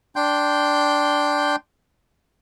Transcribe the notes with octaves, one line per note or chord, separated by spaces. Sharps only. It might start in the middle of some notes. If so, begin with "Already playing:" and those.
D4 G5 C6 G6